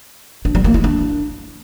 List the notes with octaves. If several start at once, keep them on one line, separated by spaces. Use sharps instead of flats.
D4
G3
A#3
E4
D4